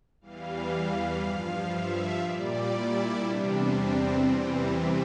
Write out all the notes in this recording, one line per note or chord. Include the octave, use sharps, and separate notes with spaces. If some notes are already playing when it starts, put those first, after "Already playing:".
E2 E3 G3 F5
G2 F3
E5
A#2 G3 D5
E4
E2 C3 G3 D4
C4
E2 C3 E3 G3
E4